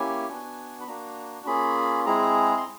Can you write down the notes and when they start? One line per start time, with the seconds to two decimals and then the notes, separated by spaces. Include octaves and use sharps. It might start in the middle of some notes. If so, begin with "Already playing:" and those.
Already playing: A#3 C#4 E4 G4 G#5
0.29 B3 D4 F#4
0.81 B5
0.88 A#3 D4 F#4 A#5
1.46 A#3 C#4 F4 G#4 B5
2.06 G#3 C4 E4 G#4 A#5
2.57 C6